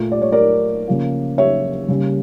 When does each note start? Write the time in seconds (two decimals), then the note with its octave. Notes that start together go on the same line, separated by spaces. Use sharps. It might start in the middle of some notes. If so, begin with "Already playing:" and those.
Already playing: A#2 A3
0.12 D5
0.22 C#5
0.32 A#4 D5
0.88 C#3 F3 A#3
1.38 C#5 E5
1.88 C#3 G3 A#3